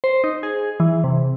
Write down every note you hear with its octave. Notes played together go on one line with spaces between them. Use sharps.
C5
D#4
G#4
E3
C3